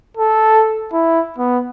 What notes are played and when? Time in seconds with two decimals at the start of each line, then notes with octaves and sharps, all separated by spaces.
0.17 A4
0.93 E4
1.38 B3